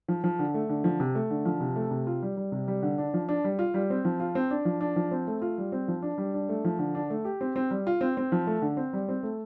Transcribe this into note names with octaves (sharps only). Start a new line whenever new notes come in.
F3
F3
D3
A3
D3
F3
C3
A3
D3
F3
C3
A3
C3
F4
G3
G3
C3
G3
D3
D4
F3
D4
G3
F4
G3
C4
F3
F4
C4
D4
F3
D4
F3
C4
A3
F4
G3
C4
F3
D4
G3
D4
A3
F3
D3
D4
A3
G4
C4
C4
G3
F4
C4
C4
F3
A3
D3
C4
G3
C4
A3